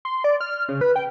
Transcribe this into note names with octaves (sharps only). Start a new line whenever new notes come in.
C6
D5
F6
C#3
B4
G5